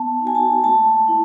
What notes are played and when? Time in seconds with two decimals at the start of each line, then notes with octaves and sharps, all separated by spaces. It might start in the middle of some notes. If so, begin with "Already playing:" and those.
Already playing: B3 A5
0.20 D#4
0.25 F#4 G#5
0.35 A5
0.64 A3 A5
1.08 E4